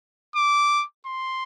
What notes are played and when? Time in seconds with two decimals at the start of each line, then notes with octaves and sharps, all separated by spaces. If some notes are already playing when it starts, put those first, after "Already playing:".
0.36 D6
1.06 C6